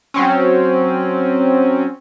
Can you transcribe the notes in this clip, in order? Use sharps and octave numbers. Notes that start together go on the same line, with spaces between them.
F#3 C4 C#4